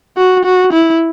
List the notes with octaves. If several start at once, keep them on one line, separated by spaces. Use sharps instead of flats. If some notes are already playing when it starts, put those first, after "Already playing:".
F#4
F#4
E4